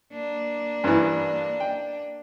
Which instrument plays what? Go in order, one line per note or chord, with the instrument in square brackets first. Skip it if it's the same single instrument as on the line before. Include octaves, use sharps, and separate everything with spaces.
[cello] A#3 D4
[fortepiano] G2 E3
G5